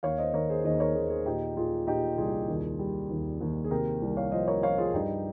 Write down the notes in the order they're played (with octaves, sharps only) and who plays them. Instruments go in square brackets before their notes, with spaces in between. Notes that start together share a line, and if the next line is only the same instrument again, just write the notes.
[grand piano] D#2 C#5 F5
C5 D#5
D#3 A#4 C#5
G#4 C5
D#2 C5 D#5
A#4 C#5
D#2 G#4 C5
G#4 C5
A#2 D#4 G4
A#2 F4 G#4
A#2 D#4 G4
C2 F4 G#4
D#2
G3
D#2
D#2
G#4
C3 G4 A#4
C2
C#5 F5
F3 C5 D#5
A#4 C#5
F3 C#5 F5
F4 G#4
G2 D#4 G4